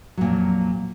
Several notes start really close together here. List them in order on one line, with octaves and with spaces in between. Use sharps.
F#3 A#2 F2